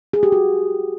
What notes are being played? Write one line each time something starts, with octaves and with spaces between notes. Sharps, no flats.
G#4
G4
F#4